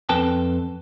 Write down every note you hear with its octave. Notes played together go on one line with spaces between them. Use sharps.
F2 C4 A4 B4 G5 A5